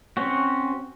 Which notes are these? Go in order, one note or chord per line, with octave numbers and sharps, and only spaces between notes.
C4 C#4 F#4